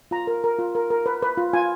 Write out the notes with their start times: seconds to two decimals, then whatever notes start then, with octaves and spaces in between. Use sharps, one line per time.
0.11 F4 A#5
0.27 A#4
0.44 A#4
0.59 F4
0.75 A#4
0.91 A#4
1.06 B4
1.23 B4
1.37 F4
1.53 F4 G#5